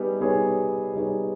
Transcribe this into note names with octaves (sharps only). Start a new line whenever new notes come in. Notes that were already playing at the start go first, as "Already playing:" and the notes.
Already playing: G3 B3 D#4 G#4
G3 B3 D#4 G#4 C#5
G3 B3 D#4 G#4 C#5